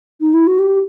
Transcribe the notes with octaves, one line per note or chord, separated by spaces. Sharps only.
D#4
E4
F#4
G4